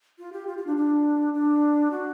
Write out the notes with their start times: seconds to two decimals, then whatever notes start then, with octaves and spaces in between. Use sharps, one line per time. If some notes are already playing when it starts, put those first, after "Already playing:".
0.19 F4
0.33 G4
0.47 F4
0.58 F4
0.67 D4
0.77 D4
1.34 D4
1.91 F#4